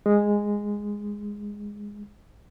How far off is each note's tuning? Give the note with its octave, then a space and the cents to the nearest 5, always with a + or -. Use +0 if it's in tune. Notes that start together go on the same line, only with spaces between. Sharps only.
G#3 -10